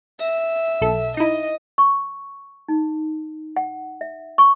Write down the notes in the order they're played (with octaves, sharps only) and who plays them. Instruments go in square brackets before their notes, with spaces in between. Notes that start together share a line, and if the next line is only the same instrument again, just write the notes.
[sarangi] E5 [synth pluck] A#6
[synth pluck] B1 A4
[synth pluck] D#4 E4 [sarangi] D#5
[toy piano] C#6
D#4
F#5
E5
C#6